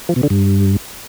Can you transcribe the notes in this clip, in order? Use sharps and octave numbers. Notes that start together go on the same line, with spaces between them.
F3
B2
D3
G2